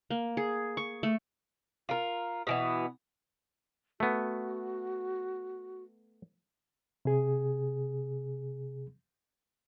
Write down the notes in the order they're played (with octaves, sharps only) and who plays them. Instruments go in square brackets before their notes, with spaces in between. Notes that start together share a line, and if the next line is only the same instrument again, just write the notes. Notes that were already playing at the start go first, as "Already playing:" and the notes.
[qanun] A#3
G#4
C#6
A3
[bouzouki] F4 A#4
B2 E3 B3
[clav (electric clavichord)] A3 B3 [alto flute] F#4
[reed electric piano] C3 G#4